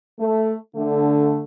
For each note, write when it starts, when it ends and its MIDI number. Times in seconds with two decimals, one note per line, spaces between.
0.20 0.54 57
0.76 1.43 50
0.76 1.43 57